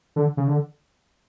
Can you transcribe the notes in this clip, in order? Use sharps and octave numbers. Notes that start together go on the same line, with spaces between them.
D3
C#3
D3